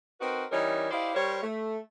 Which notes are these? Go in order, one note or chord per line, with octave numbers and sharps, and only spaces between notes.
C4 D#4 F#4 A#4 B4
E3 G3 C#4 D#4 A#4 C#5
E4 G4 C5 D5 D#5 F5
G3 A#4 C5 C#5
A3